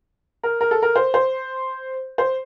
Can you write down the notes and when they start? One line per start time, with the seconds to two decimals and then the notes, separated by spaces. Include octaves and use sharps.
0.43 A#4
0.61 A#4
0.71 A4
0.82 A#4
0.96 C5
1.14 C5
2.18 C5